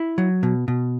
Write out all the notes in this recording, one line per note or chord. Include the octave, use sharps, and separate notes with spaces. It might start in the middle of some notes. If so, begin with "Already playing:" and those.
Already playing: E4
F#3
B2
B2